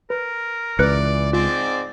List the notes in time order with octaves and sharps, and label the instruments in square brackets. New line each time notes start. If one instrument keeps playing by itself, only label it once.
[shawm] A#4 [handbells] B4
[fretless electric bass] C#2 [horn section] E3 D5 [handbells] B4 F#6 C#7
[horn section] G#2 C4 [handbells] F4 [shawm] D5